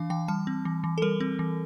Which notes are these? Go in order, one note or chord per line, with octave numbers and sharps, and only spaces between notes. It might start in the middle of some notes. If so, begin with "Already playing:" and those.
Already playing: E3 D4 F5
E3 G5
G3 A5
C4
E3
E3
A4
G3 A#4
C4
E3